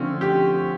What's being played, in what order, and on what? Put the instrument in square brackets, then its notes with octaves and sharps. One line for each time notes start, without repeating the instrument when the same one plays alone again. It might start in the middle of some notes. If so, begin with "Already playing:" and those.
Already playing: [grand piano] D3 F3 A3 C4 [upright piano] C#4
[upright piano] G4